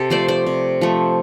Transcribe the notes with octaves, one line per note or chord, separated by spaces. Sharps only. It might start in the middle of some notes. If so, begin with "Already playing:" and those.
Already playing: C3 G4 A4
F3 A3 C5 D5
C5 D5
C3
F3 A3